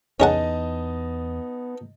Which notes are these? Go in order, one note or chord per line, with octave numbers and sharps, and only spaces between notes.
E2 B3 C#4 D#4 G#4 D#5 F#5 A5